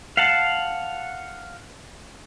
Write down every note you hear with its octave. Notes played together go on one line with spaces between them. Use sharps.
F5 F#5 A5